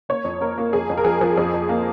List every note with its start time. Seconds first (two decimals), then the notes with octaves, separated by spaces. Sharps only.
0.09 A#3 C#5
0.24 F2
0.41 A#3 A#4
0.58 A#3
0.73 F2 G#4
0.90 F2
0.97 A#4
1.05 F3 G#4
1.21 F3
1.37 F2 G#4
1.54 F2
1.69 A#3